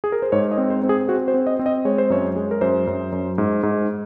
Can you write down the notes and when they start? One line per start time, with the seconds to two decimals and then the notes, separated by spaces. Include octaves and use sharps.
0.04 G#4
0.12 A#4
0.22 C5
0.32 G#2 C#5
0.51 D#5
0.58 C4
0.70 C5
0.83 C4
0.89 G#4
1.09 C4 F#4
1.28 C5
1.34 C4
1.47 D#5
1.59 C4
1.66 D#5
1.85 G#3 C#5
1.98 C5
2.10 F#2 C#5
2.36 G#3
2.51 A#4
2.61 F#2 C5
2.87 F#2
3.12 F#2
3.38 G#2
3.63 G#2